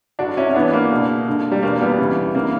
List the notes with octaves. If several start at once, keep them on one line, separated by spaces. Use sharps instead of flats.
G2 D3 D4 F#4
C#4 E4
C#4
G2 E3 B3 D4
A#3
C#2 B2
G2 D3
G3
E2 B2 A#3
G3 B3
D2 C#3 E3
C#3 E3 A#3